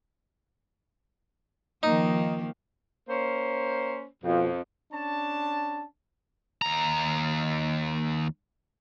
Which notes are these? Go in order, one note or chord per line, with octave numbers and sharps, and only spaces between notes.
D#3 F3 A#3 D#4
A#3 C#4 C5
F2 B2 F3 F4
C#4 D4 A5
D#2 A#5